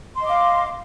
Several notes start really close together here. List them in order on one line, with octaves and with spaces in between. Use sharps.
C6 D#5 D6 F5